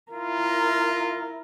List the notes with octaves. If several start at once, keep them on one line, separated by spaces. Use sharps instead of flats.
E4 F4 A#4